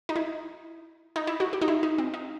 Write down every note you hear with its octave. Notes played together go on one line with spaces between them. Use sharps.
D#4
E4
D#4
E4
F#4
G4
D#4
E4
D#4
C4
D#4